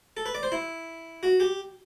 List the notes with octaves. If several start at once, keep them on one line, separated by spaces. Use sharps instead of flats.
A4
B4
D5
C5
E4
F#4
G4